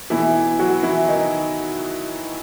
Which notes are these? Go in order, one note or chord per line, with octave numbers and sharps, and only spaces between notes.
B2 E3 E4
F#3 F#4
E3 E4
D#3 D#4